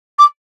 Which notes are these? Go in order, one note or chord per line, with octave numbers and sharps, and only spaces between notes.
D6